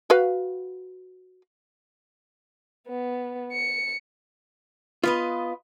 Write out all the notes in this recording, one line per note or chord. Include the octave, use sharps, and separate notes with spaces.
F#4 B4 F5
B3
C#7
B3 F4 B4 D#5